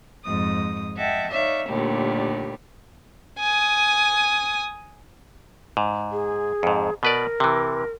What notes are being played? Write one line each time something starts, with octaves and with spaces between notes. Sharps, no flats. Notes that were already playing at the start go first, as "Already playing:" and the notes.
F2 G#2 D#6
D#5 E5 F#5 G5 A5
D#4 C#5 D5 E5 F5
D#2 A#2 D3 G3 A3
G#5 D#6
G#2
G#4
F2 G#2
B2 A#4 B4 D5
C3 E3